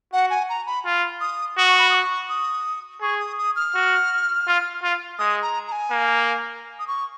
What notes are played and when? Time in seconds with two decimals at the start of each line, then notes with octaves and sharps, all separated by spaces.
0.13 F#4 F#5
0.30 G#5
0.49 A#5
0.66 B5
0.85 F4
1.21 D#6
1.57 F#4 D#6
1.67 C#6
1.78 B5
1.90 D#6
1.94 C#6
2.29 D#6
3.01 G#4 C#6
3.20 D#6
3.38 D#6
3.56 F6
3.74 F#4
4.47 F4
4.83 F4
5.19 G#3 D#6
5.42 A#5
5.67 A#5
5.72 G#5
5.90 A#3
6.79 D#6
6.88 C#6